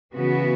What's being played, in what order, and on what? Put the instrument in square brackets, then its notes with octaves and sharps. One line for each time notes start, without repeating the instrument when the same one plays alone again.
[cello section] C#3 E3 B3 F#4 B4